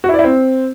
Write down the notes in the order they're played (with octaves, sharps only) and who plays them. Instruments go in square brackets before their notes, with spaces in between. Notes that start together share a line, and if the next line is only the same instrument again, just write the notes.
[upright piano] F#4
E4
D5
E4
C4